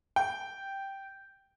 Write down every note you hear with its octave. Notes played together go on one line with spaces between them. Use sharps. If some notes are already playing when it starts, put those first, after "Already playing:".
G5